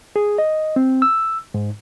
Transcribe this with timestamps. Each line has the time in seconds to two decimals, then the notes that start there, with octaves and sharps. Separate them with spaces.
0.16 G#4
0.38 D#5
0.76 C4
1.02 E6
1.54 G#2